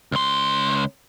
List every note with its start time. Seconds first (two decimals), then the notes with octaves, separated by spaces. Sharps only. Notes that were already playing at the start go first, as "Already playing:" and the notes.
0.12 C#2 C6